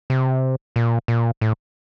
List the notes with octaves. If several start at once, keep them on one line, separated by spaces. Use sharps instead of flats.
C3
A#2
A#2
A2